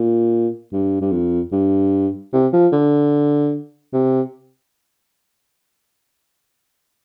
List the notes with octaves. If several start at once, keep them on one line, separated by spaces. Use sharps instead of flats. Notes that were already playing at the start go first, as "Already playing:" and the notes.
Already playing: A#2
G2
G2
F2
G2
C3
F3
D3
C3